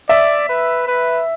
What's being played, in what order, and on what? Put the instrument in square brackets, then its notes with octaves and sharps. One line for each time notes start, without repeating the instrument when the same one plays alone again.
[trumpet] D5 [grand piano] E5
[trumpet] B4
B4